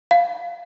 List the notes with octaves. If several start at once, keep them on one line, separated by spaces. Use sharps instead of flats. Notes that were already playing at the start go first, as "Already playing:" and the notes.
F5